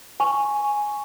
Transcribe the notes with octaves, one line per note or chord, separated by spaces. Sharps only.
G#5 C#6